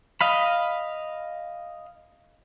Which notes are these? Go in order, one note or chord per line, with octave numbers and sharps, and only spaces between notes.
D#5 F5 B5